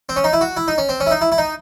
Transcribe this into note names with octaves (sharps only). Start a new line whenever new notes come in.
C4
C#4
D#4
E4
F#4
E4
D#4
C#4
C4
C#4
E4
D#4
E4
E4
D#4